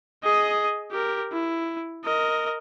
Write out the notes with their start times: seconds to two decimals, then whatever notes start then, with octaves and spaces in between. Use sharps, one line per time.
0.23 G#4 D#5
0.91 G4 A#4
1.32 E4
2.05 A#4 D#5